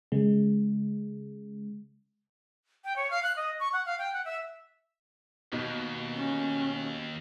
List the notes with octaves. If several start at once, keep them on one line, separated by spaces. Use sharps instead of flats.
C#3 G#3
G5
C#5
F5
F#6
D#5
C#6
F#5
F5
G5
F#5
E5
D#2 B2 D#4
C#4